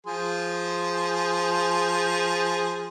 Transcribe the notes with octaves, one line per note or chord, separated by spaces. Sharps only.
F3 G#4 C6